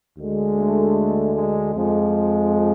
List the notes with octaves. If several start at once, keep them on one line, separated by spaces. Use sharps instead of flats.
D2 D3 G#3
A3
G#3
F2 F3 G#3